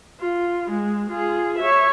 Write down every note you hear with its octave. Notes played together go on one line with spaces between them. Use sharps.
F4
G#3
F4 G#4
C#5 E5